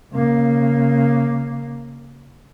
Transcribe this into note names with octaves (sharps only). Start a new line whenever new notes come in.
C#3 A#3